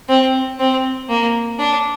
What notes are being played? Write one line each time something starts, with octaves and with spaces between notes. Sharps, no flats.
C4
C4
A#3
D4